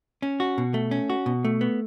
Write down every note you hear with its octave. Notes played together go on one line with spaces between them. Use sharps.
C#4
F#4
B2
A3
C#4
F#4
B2
A3
B3